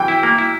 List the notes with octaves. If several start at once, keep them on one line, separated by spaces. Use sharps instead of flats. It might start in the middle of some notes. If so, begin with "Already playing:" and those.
Already playing: E3 G5
E4
A#3
E4